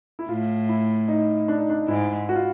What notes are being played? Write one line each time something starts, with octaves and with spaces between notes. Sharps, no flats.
E4
A2 F4
E4
D#4
D4
D#4
D4
G#2 E4
F#4
F4